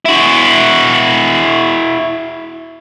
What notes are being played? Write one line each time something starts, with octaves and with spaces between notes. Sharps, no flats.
E4 F#4